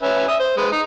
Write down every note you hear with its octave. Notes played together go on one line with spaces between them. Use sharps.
C#4 B4 E5
E5 D#6
C5
G#3 B4
D#4